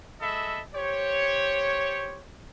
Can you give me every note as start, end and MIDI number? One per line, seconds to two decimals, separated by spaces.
0.20 0.61 56
0.20 0.61 69
0.20 0.61 75
0.20 0.61 76
0.20 0.61 83
0.73 2.23 67
0.73 2.23 72
0.73 2.23 73